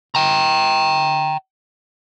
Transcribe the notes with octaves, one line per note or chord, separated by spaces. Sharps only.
G5 A#5